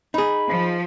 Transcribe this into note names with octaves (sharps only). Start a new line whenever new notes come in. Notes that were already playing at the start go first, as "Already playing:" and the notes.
D#4 G#4 B5
F3